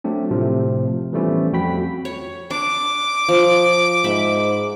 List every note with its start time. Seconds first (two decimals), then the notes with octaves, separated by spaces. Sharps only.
0.04 F#3 A3 C4 D4
0.31 A2 C3 F3 A3
1.13 E3 F3 G3 A3 B3 C#4
1.53 F2 F#4 G5 B5 B6
2.05 C#5
2.51 D4 D6
3.29 F3
4.04 G#2 E5 B5